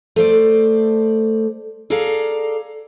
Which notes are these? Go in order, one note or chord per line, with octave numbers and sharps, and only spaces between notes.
A3 C5 D5
G#4 A4 D5 F5 A#5